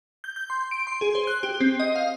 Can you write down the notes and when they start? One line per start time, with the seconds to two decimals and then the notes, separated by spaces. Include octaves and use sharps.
0.24 G6
0.36 G6
0.50 C6
0.71 D7
0.87 C6
1.01 G#4
1.15 C5
1.27 F#6
1.43 G4
1.61 C4
1.80 D#5
1.96 F5